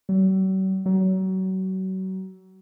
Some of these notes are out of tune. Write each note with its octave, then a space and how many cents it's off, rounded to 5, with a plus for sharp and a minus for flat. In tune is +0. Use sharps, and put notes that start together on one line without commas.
F#3 +45
F#3 +30